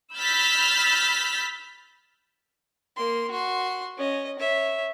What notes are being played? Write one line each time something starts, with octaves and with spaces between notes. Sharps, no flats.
B5 E6 F6 G6 A6 B6
A#3 C6
F#4 C6
C#4 D#5
C#5 E5